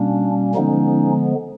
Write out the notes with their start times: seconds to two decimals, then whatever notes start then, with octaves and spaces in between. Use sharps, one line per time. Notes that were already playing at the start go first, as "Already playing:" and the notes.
Already playing: B2 G3 A#3 C#4 D4
0.55 D3 F3 G#3 B3 C#4 D#4